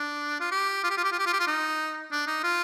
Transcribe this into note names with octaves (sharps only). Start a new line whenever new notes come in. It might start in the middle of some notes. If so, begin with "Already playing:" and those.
Already playing: D4
F4
G4
F4
G4
F4
G4
F4
G4
F4
G4
F4
D#4
D4
D#4
F4